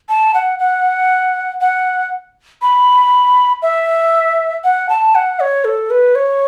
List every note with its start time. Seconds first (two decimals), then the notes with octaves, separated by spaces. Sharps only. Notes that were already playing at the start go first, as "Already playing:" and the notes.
0.09 A5
0.34 F#5
0.59 F#5
1.61 F#5
2.62 B5
3.62 E5
4.64 F#5
4.89 A5
5.15 F#5
5.40 C#5
5.65 A4
5.90 B4
6.15 C#5